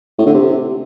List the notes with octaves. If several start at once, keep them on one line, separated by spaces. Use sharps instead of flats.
A2
D3
C3